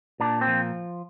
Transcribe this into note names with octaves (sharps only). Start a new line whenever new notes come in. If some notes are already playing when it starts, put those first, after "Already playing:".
A#2 D4
C4
F3